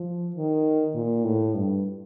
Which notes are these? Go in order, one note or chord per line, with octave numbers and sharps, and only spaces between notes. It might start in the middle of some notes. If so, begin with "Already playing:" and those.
Already playing: F3
D#3
A#2
A2
G2